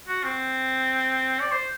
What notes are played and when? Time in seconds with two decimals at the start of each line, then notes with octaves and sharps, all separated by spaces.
0.08 F#4
0.24 C4
1.40 D5
1.52 C5